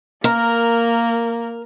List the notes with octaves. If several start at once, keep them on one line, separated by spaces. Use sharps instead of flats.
A#3 A#4